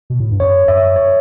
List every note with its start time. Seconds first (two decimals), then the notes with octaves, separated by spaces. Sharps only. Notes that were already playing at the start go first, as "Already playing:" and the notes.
0.10 B2
0.20 A2
0.31 G2
0.40 F#2 C#5
0.68 F#2 E5
0.96 C#5